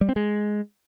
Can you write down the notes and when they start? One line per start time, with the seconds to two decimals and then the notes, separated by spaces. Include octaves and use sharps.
0.01 G3
0.09 C4
0.16 G#3